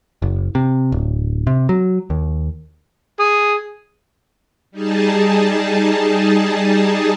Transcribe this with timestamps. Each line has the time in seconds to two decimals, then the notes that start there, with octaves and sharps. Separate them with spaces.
0.22 F#1
0.55 C3
0.92 D1
1.47 C3
1.69 F#3
2.10 D#2
3.20 G#4
4.71 G3 D#4 G#4 A5